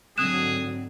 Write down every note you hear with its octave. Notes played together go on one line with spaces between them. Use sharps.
G#2 D3 F#3 C4 G#4 D#6 F#6 E7